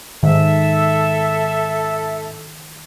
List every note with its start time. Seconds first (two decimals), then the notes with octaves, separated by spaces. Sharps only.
0.23 G#2 D#3 A4 E5